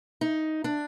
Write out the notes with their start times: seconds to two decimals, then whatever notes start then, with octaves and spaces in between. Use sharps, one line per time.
0.21 D#4
0.64 D4